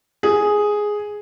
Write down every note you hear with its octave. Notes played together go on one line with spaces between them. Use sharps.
G#4